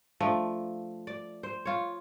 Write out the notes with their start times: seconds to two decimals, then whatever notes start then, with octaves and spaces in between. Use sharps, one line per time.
0.20 F3 A3 D4
1.07 D5
1.43 C5
1.65 F4 C#5